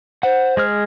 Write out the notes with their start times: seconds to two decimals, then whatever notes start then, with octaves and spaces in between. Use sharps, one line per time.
0.23 C5 F#5
0.57 G#3 G#4 F6